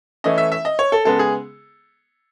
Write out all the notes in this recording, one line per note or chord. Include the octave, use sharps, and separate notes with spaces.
E3 A3 C#4 D#5
E5
E5
D#5
C#5
A4
C#3 G#3 B3 A4
G#4